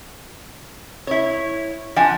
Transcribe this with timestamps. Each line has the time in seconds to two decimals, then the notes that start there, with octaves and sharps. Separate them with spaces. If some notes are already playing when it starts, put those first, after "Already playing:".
1.07 E4 C#5
1.96 F3 D4 F#5 G#5